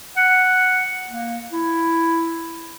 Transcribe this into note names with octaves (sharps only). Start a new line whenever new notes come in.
F#5
A#3
E4